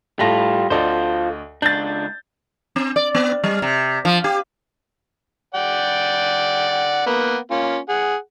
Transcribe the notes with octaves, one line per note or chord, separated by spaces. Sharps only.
A2 G3 F4 A5 A#6
D2 F4 A4 C5 D5 D#5
C#2 D4 G6 A6
C4
D5
B3
G3
C3
F3
G4
D5 F#5 G5
A#3 B3
A#3 C#4 F4
G#4 F#5